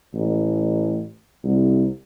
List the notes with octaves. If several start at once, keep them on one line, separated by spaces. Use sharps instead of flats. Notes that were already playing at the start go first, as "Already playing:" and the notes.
A1
C2